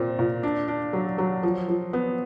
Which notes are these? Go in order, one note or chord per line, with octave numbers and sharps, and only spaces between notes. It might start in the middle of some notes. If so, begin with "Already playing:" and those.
Already playing: A#2 C4
A#2
D4
D4
F#3
F#3
F3
F3
B3